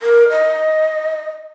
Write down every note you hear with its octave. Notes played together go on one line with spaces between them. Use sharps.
A#4
D#5